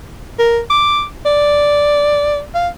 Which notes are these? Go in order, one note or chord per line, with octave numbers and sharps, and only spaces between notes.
A#4
D6
D5
F5